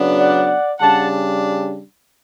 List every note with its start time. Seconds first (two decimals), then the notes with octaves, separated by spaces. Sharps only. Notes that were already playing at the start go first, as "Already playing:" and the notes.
Already playing: C#3 F#3 B3 D4
0.17 D5 F#5
0.80 C#3 G3 D4 F#5 A5